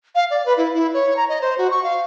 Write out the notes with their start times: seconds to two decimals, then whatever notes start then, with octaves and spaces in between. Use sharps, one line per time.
0.15 F5
0.30 D5
0.45 B4
0.57 E4
0.74 E4
0.94 C#5
1.16 A#5
1.29 D#5
1.41 C5
1.58 F#4
1.70 C#6
1.84 F5